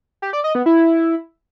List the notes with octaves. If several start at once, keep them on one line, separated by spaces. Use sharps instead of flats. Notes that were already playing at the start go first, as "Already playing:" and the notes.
G4
D5
D#5
B3
E4